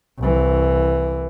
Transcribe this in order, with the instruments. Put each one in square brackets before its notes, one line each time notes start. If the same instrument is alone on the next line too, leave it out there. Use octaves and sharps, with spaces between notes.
[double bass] C2 E3